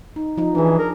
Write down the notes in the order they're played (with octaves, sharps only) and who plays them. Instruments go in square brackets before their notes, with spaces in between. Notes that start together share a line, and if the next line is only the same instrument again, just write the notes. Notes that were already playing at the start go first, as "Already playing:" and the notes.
[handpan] D#4
F3 D#4
[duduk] E3 [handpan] D4 G#4
[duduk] A#4